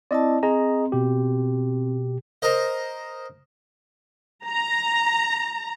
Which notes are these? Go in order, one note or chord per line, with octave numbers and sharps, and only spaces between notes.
C4 E4 D5 D#5 A5
C4 G#4 D#5 A#5
B2 G4
A#4 C5 D#5
A#5